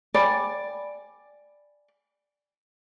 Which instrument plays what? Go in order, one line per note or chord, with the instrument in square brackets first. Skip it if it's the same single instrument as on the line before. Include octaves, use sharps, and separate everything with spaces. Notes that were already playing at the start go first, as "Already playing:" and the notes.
[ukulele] D5 [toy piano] G5 G#5 B5